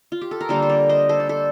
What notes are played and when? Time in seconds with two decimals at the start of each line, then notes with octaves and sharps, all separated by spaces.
0.12 F4
0.21 G4
0.31 A4
0.41 A#4
0.49 D3 G3 A#3 A4 C5
0.62 C5
0.70 A#4 D5
0.89 C5 D#5
1.09 A4 C5
1.20 D5
1.29 A4 C5